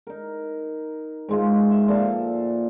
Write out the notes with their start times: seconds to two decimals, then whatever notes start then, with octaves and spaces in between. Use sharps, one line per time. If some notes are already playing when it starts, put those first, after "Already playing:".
0.07 D#4 A#4
1.29 G#2 G#3 F4
1.71 E5
1.88 A#2 F3 A4 F5